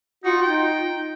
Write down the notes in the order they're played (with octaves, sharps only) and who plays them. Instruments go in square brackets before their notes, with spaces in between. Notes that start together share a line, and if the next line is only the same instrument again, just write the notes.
[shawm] D#4 [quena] F4 [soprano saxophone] F#4
[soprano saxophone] D#4 [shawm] G5